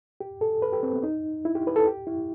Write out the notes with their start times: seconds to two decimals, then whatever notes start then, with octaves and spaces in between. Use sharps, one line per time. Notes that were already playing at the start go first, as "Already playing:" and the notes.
0.20 G4
0.41 A4
0.62 B4
0.73 G4
0.83 C4
0.93 B3
1.03 D#4
1.45 E4
1.55 G4
1.67 B4
1.76 A4
1.87 G4
2.07 E4